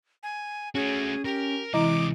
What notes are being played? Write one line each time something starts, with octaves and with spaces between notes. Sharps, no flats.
G#5
A3 C#4 F#4 G#4
G4 A#4
C3 E3 G#3 E4 D#5 A#5 D6